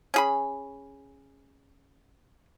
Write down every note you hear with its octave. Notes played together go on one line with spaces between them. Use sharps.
C#4 G#4 B5